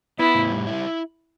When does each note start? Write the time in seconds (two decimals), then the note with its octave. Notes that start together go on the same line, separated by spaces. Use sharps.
0.19 B3 E4
0.35 A2
0.50 G3
0.67 E4